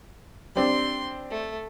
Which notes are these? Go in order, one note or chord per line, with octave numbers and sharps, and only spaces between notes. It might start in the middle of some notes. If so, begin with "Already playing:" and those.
G3 C4 D4 C6
A3